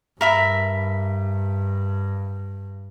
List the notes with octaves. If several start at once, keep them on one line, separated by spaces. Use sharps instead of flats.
G2 A#4 E5 B5